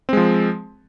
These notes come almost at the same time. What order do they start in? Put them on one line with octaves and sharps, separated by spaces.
C4 G#3 F3